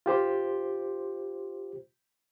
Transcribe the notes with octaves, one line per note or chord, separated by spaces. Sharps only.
F4 G4 C5